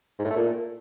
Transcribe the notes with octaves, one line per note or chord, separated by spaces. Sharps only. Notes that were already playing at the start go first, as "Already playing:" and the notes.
G#2
A2
A3
A#2